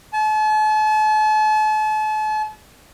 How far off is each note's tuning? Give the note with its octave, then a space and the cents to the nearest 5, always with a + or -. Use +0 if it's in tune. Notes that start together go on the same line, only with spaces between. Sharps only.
A5 -40